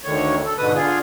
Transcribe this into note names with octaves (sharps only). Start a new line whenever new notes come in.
D2 D3 D#3 C#5
A4
G#2 B2 D3 B4 D#6
D3 F4 G#4